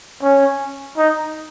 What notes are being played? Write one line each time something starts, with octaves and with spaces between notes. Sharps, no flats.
C#4
D#4